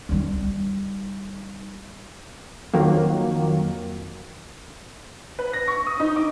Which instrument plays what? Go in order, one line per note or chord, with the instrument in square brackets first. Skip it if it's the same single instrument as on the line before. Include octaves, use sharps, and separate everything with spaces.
[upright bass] G3 D#4
[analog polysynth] F2 D#3 F#3 A#3
[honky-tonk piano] B4
A#6
C#6
D#6
D#4
D6